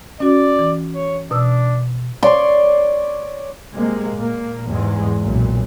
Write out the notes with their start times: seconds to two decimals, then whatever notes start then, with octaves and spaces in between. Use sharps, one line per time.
0.20 C#4 F#4 D5
0.59 E3
0.95 C#5
1.31 B2 D4 D#6 E6
2.23 C#5 D5 C6
3.75 C3 G#3 A#3
4.15 A#2 A#3
4.69 E2 G#2 C3 G#3
5.21 B1 F#2 A#2